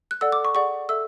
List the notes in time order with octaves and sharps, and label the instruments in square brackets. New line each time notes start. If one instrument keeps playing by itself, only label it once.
[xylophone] F#6
A4 D5 F#5 E6
D6
C#6
G#4 D5 F#5 C#6
A4 E5 E6